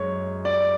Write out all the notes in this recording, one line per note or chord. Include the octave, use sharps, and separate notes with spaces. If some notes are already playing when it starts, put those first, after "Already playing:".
Already playing: F#2 G#3 C#5
D5